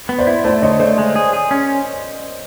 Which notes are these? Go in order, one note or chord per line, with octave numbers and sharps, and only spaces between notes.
B3
C5 D5
E4
A3 C5 D5
D3 C#5 D#5
A3 C5 D5
G#3
G#4
G#4
C#4